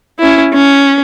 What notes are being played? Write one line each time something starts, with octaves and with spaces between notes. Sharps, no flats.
C#4 E4
C#4